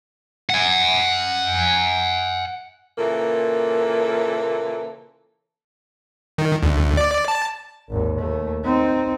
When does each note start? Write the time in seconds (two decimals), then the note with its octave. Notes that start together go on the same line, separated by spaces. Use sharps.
0.50 F#5 G#5
2.98 A#2 C#3 E3 A#3 A4
6.38 D#3
6.63 D2
6.97 D5
7.28 A5
7.90 G#1 D#2
8.19 D#2 A3
8.64 C4 D#4